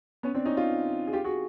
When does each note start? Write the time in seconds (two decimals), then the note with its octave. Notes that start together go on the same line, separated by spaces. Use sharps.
0.23 B3 C#4
0.35 C4 D4
0.46 C#4 D#4
0.57 D#4 F4
1.07 G#4
1.13 F4 G4
1.24 F#4 G#4